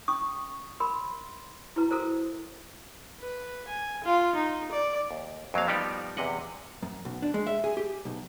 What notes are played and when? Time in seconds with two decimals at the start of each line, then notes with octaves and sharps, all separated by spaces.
0.08 C#4 C#6 D#6
0.80 A#4 B5 C6
1.76 E4 F#4 B4 A#5
1.90 F#4 A4 A#4 C5 A#5
3.20 B4
3.68 G#5
4.04 F4
4.35 D#4
4.72 D5
5.11 D#2
5.54 F2 F#3 A#3 F5
5.67 F3 G3 B3 D#4 G4 D5
6.17 E2 C3 D#5 F#5
6.83 F#2
7.05 B1
7.22 D4
7.34 G#3
7.47 E5
7.64 G#4
7.77 G4
8.05 B1